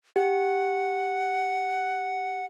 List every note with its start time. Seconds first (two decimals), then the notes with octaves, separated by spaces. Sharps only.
0.16 G4 F#5